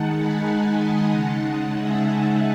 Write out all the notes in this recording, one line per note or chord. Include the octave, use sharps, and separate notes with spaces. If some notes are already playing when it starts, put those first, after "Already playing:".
Already playing: D#3 G#3 D#4 F#5 A5
G#5 B5
F#5 A5
D#5 F#5
C#3 G#3 D#4 F#5 A5
F#5 A5
E5 G#5
E5 G#5